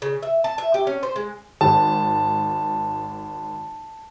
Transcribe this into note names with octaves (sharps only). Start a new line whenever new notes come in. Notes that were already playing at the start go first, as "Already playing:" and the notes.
C#3
E5
A5
E5
G4
C#4
C5
G#3
G#1 A5